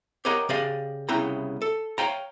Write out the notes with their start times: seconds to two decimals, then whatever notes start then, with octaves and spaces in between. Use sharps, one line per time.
0.25 G4 A#4 C#5 D#5 F#5 A#5
0.49 C#3 G4 D5 D#5 F5
1.09 C2 C#3 B3 E4 G5 A#5
1.62 A4
1.98 C#5 D5 F5 G5 A#5